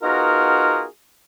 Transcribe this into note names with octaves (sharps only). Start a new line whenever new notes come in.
B3 D#4 F4 F#4 G#4 A#4